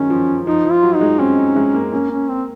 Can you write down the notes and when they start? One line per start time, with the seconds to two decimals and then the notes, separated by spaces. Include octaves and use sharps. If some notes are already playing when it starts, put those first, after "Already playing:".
Already playing: D#3 F#3 G#3 C#4
0.10 F3
0.47 F3 D#4
0.65 F3
0.72 F4
0.83 F#3
0.95 D#4
1.01 G#3
1.19 C4 C#4
1.37 D#4
1.56 G#3
1.75 A#3
1.92 A#3 C#4
2.11 C#4
2.29 C4